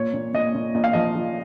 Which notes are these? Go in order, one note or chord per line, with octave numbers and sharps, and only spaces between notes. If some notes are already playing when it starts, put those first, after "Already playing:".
Already playing: A#2 C#5
A#2
A#2 D#5
A#2
A#2 D#5
F5
F3 D#5
F3